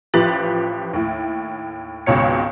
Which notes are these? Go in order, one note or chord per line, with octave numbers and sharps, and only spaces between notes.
A1 F3 G4 B4 A6 F#7
D#2 A2
G#1 C#2 B2 C#5 C#7